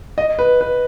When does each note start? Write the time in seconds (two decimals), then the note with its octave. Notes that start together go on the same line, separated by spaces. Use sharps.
0.18 D#5
0.39 B4
0.61 B4